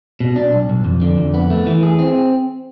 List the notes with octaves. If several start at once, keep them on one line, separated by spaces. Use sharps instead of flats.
B2
D4
B1
B1
F2
D3
F2
B3
A3
E3
G#4
C4